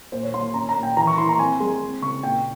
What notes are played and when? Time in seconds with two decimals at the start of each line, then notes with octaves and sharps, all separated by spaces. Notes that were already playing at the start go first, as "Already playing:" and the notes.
0.12 A#2 C5
0.23 C#5
0.34 A#3 C6
0.54 C#4 A#5
0.69 A#5
0.76 A#2
0.83 G5
0.97 E3 A#5
1.07 C#6
1.18 E4 C6
1.29 A#5
1.39 C4 G#5
1.60 G#3 C6
1.81 C4
2.02 C#3 C#6
2.23 A#2 G5